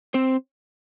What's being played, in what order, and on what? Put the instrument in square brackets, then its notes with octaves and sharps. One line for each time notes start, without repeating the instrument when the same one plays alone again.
[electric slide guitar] C4 C5